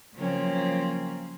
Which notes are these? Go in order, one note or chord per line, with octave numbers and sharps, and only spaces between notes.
C#3 F3 F#3 A#3 C4 C#4